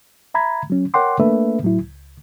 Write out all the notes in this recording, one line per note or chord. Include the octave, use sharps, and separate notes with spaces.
E5 A#5 B5 G#6
F#3 C#4
A#4 C#5 F#5 G5 C6 D6
A3 A#3 D4 A4 B4 E5
A2 F#3 E4
C#2